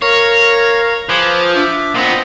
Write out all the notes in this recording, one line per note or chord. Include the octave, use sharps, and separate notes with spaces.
A#4 C#5 F5 A#5
F3 G#4 B4 D6
D4 E5 D6
A#2 B3 C4 D#5